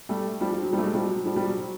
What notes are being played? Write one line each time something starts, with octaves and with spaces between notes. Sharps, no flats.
G3 A3
F3 G3
F3
F#3
F3 G3
A3
F#3 G#3
F3 G3
F#3
F#3
F3 G3
F3 G3
F#3